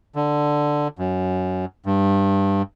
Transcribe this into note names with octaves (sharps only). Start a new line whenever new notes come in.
D3
F#2
G2